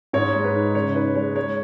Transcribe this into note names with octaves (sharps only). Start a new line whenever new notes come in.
G#2 C#5
G#3
B4
D#4
C#3 C#5
D#4 B4
G#3 C#5
G#3 C#5